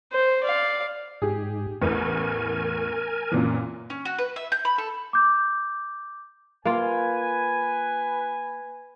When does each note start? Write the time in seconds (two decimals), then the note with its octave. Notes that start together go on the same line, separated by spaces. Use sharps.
0.13 C5
0.44 D5 F5
1.22 G#2 G4 G#4
1.81 A1 E2 A2 A#4 G#5
3.32 F#2 A#2 E3
3.90 C#4
4.05 F#4
4.18 B4
4.36 E5
4.52 G6
4.65 B5
4.78 A4
5.13 D6 G6
6.65 A#3 F4 B4 G#5